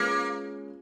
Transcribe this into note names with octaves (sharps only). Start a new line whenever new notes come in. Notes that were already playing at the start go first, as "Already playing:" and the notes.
Already playing: G#3 A#3 C#4 F4 G#4 B4